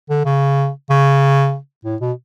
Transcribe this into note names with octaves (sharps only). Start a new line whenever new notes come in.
D3
C#3
C#3
A2
B2